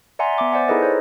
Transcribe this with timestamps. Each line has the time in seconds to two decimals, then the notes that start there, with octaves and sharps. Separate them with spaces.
0.19 D5 E5 F#5 G#5 A#5 C6
0.38 B3 E5 D6
0.52 C5 D5 F#5 G#5
0.68 D#4 E4 G#4 A4 B4 D#5
0.82 C5 C#5